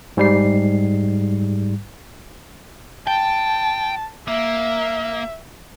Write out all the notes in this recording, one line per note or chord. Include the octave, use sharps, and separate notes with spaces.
G#2 G3 C7
G5 A5
A#3 E5